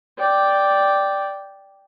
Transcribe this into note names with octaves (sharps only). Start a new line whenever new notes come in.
D5 G5